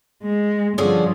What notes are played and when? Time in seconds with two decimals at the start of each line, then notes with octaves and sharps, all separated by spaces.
0.23 G#3
0.78 G2 D3 F3 C#4 G#4